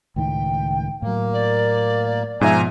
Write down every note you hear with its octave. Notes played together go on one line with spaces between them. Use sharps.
C#2 A2 D#3 G5
A2 F#3 A#3
D5
G#2 B2 F3 E5 G#5 A#5